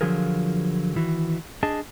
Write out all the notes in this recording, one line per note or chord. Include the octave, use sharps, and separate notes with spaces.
D3 F3 F#3 F4 G#4 A#4
D#3 E3 F#4
D4 G#4 D#5 A5